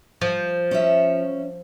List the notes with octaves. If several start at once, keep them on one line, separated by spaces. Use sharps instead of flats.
F3
C#4 C#5 E5